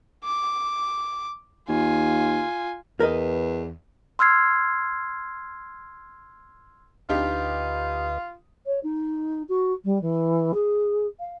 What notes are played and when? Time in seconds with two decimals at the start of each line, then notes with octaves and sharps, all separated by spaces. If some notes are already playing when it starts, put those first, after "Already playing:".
0.24 D6
1.69 D#2 F4 G#5
3.00 E2 A#4 B4 D#5
4.19 C6 E6 F6 G#6 C7
7.09 D2 D4 D#4 F4 G4 B4 D#5
8.66 C#5
8.83 D#4
9.49 F#4
9.84 G3
10.01 E3
10.54 G#4
11.20 F5